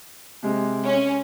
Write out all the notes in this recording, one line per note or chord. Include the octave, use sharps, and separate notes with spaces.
C3 G#3
C#4